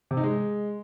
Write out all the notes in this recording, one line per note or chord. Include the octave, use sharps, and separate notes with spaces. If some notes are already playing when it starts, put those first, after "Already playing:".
C3
D#4
G#3